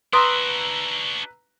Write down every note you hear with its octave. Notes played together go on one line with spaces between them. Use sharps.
D4 F#4 B4 A#5 C6 D#6 E6